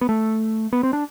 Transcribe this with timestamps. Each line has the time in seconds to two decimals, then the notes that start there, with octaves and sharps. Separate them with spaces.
0.01 B3
0.09 A3
0.73 B3
0.83 C4
0.93 D4